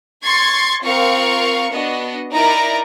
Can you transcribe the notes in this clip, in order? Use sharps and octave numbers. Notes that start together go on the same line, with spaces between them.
C6 C#6 G#6 A6 C7
C4 F4 A#4 F5 C#6 C#7
B3 D4 F#4 D#5
D#4 E4 A#4 D5 A#5